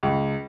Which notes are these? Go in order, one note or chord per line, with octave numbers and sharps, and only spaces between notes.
C#2